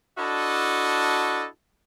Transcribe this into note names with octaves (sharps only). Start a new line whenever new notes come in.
D4 E4 F#4 A4 D#5